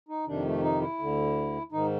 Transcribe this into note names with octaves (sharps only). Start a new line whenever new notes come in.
D#4
F2 C3 D#3 D4
A3
D#4
E4
D2 D3
G#2 D#3 D#4